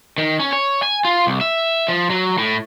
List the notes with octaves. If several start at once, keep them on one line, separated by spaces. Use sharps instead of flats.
D#3
C#4
C#5
G#5
F4
C2
E5
F3
F#3
A2